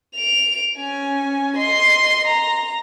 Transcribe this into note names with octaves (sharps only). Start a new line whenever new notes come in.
D7 F7
C#4 G#5
D#5 C6
A#5